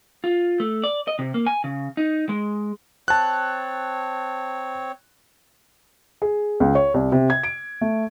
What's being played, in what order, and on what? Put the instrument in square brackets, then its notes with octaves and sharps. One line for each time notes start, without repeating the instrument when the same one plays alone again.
[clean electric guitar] F4
A3
D5
D#5
C3
A#3
G#5
C#3
D#4
G#3
[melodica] C4 C#5 [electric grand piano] A5 F#6
[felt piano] G#4
C#2
C#5
C2
C3
G#6
D7
A3